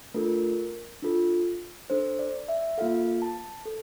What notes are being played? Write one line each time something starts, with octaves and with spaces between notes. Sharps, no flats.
A3 D4 F4 A4 A#4
D4 F4 A4
D4 A4 C5
D5
E5
A#3 F4 A4 F5
A5
A4